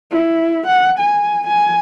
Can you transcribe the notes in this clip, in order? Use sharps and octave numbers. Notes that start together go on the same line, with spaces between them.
E4
F#5
G#5
G#5